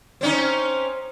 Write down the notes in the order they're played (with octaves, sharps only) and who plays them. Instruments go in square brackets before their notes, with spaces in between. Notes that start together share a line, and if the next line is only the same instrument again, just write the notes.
[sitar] C4 C#4 D#4